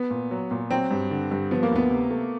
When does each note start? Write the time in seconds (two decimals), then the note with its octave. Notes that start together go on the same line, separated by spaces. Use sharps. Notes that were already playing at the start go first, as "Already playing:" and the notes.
Already playing: B3
0.11 A#2
0.31 F#3
0.51 A#2
0.71 F#3 C4
0.91 G2
1.11 D3
1.31 G2
1.51 F3 B3
1.63 A#3
1.71 D2 B3
1.90 C3
2.11 A3